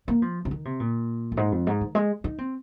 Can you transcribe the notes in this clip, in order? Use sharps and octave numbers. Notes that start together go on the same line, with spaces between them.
A#3
F3
C3
D#3
C3
A#2
F2
G#2
F2
G#2
D#3
G#3
D#4
C4